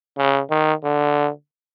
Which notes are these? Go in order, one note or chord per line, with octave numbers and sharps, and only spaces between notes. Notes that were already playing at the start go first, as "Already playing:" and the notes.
C#3
D#3
D3